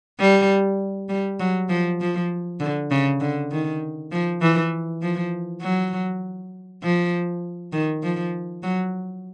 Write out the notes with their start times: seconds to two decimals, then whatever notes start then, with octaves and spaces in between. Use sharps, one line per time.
0.19 G3
1.09 G3
1.40 F#3
1.69 F3
2.01 F3
2.60 D3
2.91 C#3
3.21 D3
3.51 D#3
4.11 F3
4.41 E3
5.02 F3
5.61 F#3
6.83 F3
7.72 D#3
8.03 F3
8.63 F#3